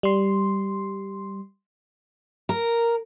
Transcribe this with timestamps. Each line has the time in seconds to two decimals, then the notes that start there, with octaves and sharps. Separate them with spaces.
0.03 G3 C6
2.49 A#4